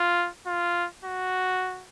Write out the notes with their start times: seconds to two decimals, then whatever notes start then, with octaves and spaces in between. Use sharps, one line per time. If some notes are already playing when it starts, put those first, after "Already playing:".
Already playing: F4
0.47 F4
1.04 F#4